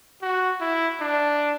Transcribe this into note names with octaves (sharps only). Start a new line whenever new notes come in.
F#4
E4
D4